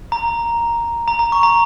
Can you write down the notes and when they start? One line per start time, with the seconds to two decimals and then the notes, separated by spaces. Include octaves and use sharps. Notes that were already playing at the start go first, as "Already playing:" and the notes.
0.12 A#5
1.08 A#5
1.19 A#5
1.32 C#6
1.43 A#5